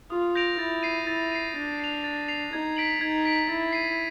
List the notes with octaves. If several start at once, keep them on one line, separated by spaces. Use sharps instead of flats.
F4 D#6
G6 A#6 D7 F7
E4 A6
C7 D#7
E4 A6
C7 D#7
D4 A6
C7 F7
A6
C7 F7
D#4 G#6
B6 D7 F#7
D#4 G#6
B6 D7 F#7
E4 A6
C7 D#7